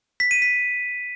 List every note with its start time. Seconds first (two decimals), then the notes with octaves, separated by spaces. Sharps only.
0.20 B6
0.31 D#7
0.42 B6